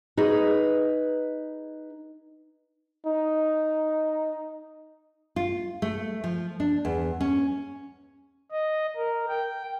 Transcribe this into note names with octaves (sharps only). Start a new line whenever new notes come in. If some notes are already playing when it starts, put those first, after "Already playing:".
D#4 G#4 B4 D#5
D#4
F4
A3
F3
D4
E2
C#4
D#5
A#4
G5